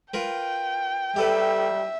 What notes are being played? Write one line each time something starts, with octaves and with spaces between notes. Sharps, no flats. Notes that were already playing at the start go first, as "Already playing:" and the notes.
F4 A#4 B4 G5
G3 G4 A4 B4 E5